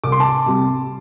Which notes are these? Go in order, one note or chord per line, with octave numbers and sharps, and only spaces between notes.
C2 D6
C6
A5 D6
C3 G3